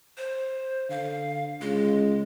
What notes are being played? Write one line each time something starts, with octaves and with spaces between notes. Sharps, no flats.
C5
D3 F5
C#2 G#3